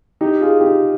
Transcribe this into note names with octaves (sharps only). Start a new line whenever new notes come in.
D#4 G4
F4 G#4
D#4 G4